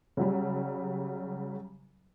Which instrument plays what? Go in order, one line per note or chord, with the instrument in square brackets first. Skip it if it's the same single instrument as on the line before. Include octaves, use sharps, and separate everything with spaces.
[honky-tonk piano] C#3 F#3 G3